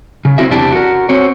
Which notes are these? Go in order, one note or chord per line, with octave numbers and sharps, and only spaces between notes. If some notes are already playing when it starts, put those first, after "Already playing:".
C#3
C4 E4 F#4 E5
E2 C3 D4 E4 G4 A5
F#4 A#4
C4 F#4 C#5